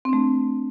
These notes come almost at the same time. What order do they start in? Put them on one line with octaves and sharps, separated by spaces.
C4 D4 A3